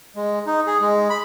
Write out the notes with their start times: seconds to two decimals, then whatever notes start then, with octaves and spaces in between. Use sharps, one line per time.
0.16 G#3
0.47 D#4
0.66 G#4
0.81 G#3
1.10 B5